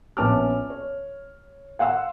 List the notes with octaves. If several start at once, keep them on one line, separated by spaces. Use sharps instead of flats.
A#1 B3 C#4 A5 D6 F6
C#5
F5 F#5 C6 E6